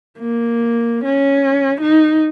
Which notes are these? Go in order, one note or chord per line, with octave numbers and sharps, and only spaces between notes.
A#3
C#4
D#4